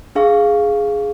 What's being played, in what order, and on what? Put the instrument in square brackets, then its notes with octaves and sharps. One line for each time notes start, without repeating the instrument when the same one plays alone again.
[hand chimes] D4 G#4 F5 C#6